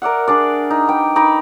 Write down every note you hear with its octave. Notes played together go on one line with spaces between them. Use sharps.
A#4 D5 E5 F#5
D4 G#4 D5
D#4
B4 G5
D#4 B5 D6